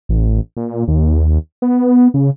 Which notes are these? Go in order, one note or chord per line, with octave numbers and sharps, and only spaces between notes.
A1
A#2
D#2
B3
C#3